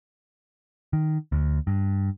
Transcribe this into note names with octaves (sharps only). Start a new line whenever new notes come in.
D#3
D2
G2